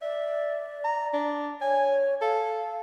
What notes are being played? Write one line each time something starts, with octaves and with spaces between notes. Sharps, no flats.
D5 E5
A#5
D4
C#5 G#5
A4 F5